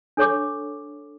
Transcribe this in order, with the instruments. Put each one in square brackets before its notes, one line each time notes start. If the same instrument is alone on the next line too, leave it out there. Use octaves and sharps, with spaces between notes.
[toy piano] D4 A4 C#5 C#6 D6